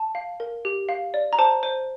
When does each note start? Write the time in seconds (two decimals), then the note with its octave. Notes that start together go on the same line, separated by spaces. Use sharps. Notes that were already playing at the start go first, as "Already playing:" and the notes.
Already playing: A5
0.15 F5
0.40 A#4
0.65 G4
0.89 F5
1.14 D5
1.33 A#5
1.39 C5 A5
1.63 C5